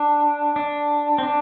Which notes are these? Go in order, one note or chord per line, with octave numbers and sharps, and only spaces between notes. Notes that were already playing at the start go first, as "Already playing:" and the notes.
Already playing: D4
D4
C4
D4